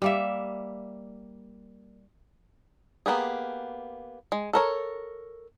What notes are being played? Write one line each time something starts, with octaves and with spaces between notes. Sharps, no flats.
G3 A#3 E5
A#3 B3 G4 G#4
G#3
A4 A#4 C#5